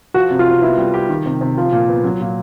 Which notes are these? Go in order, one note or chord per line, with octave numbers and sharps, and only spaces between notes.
F3 F#4
C3
F4
C3
B3 E4
G3
G4
D#3
C3
C3
F3 F4
A#2
B3
F#3
A#2